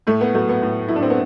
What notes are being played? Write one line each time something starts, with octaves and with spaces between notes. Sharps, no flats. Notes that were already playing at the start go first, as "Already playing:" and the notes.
A2 A3
B3
F#3 A3
B3
A2
F#3 E4
D4
C4
B3